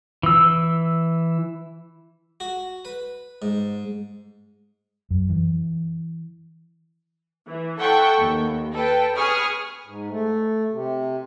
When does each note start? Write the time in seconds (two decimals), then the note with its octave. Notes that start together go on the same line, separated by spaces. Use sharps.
0.23 E3 E6
2.40 F#4
2.85 B4
3.42 G#2
5.10 F#2
5.29 E3
7.46 E3
7.79 A4 E5 F#5 G5 C#6
8.19 D#2
8.72 A4 B4 G5
9.16 G#4 B4 C#6 D#6 F6
9.87 G#2
10.11 A3
10.72 C3